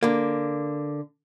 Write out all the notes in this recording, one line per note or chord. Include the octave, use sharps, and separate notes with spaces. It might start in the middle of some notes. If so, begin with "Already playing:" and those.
D3 A#3